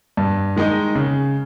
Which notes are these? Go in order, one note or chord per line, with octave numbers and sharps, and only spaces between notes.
G2
D#3 G#3 D#4
C#3